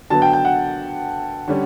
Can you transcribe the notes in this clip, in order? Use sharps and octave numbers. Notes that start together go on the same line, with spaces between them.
D3 F#3 B3 A5
G5
G5
F#5
D3 G3 C#4